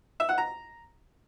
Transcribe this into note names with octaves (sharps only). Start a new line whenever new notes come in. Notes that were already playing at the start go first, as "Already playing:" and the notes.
E5
F#5
A#5